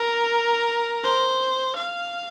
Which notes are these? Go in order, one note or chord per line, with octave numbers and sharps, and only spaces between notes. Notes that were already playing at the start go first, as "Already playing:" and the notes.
Already playing: A#4
C5
F5